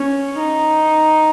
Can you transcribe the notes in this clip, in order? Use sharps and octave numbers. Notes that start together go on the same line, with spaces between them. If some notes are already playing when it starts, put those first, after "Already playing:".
Already playing: C#4
D#4